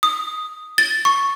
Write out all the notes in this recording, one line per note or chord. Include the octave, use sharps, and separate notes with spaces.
D#6
A6
C#6